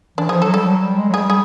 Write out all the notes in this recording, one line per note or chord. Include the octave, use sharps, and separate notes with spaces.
E3 D4
F3 G#4
F#3 A4
G3 A4
F#3
G3
G#3
F#3
G3 G#4
G#4